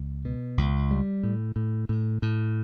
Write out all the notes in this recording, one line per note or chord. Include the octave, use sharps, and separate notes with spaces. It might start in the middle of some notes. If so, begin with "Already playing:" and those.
Already playing: C#2
B2
C#2
G3
A2
A2
A2
A2